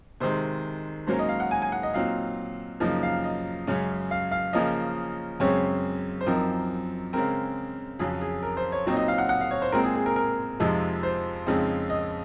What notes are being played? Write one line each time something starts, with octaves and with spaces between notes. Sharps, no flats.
C3 D#3 G#3 C5
G#2 F#3 A#3 C#4 C5
D#5
F5
F#5
G#5
G#5
F#5
D#5
A#2 F#3 C4 D#4 F5
F#2 C#3 F3 A#3 D#4
F5
D#5
F#2 C#3 G#3 C#4
F5
F5
C#3 F3 A#3 C#4 D#5
F#2 C#3 G#3 C4 C#5
C5
F#2 F3 C4 D#4 A#4
C#3 G#3 C4 A#4
F2 C#3 F#3 G#4
G#4
A#4
C5
C#5
A#2 F#3 C4 D#4 C#5
D#5
F5
F#5
F#5
F5
C#5
C5
A#2 G#3 C4 A#4
G#4
G#4
A#4
A#4
F2 C3 F3 G#3 D#4
C5
F2 C#3 G#3 C4 D#4
D#5